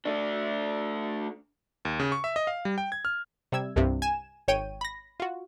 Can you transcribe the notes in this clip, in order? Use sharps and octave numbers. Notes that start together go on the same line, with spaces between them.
A3 D4
D#2
C#3
C#6
E5
D#5
F5
G3
G5
G#6
F6
C3 G3 E6 G#6
C2 G2 C3
G#5 E7
G#1 C#5 G5 D#7
B5 A#6
F4 F#4